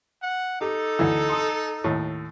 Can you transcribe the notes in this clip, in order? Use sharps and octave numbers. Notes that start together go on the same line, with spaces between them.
F#5
D#4 G4 A4
D2 E3
C6 D#6
D#2 A2